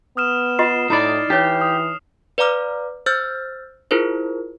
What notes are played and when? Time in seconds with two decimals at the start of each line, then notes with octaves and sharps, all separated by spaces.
0.17 B3 D#6 F6 E7
0.59 F4 D#5 C6 C7 E7
0.90 A2 D#4 E4 D5 B5
1.30 E3 D#4 G4 C#5
1.61 D#6
2.38 B4 D5 F5 A#5 D6 F6
3.06 C5 E6 F6 G6 A6
3.91 E4 F4 G#4 A#4 C5